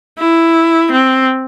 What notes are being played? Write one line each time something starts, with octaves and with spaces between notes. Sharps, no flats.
E4
C4